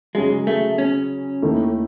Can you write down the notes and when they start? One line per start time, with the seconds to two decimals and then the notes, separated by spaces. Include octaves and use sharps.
0.15 C#3 F#3 G#3 C#4 G#4
0.47 A3
0.78 C#4
1.42 D#2 D#3 A3 E4